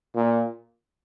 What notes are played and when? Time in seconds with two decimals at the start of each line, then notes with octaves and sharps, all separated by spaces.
0.15 A#2